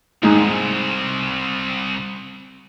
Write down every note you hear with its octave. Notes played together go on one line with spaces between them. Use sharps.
C2 G#2 G#3 D#4